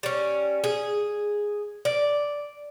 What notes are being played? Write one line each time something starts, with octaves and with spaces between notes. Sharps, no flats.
G3 C#4
G#4
D5